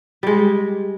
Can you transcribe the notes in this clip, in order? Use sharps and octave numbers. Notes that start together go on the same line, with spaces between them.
G3 G#3